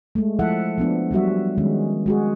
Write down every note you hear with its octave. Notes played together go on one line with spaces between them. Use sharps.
G#3 A3
F3 E4 A4 E5 F#5
F3 B3 D4
F#3 G3 F#4 E5
D#3 G#3 C#4
G#3 F#4 G#4